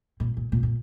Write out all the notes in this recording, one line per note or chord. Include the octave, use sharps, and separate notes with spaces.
A#2
A#2
A#2
A#2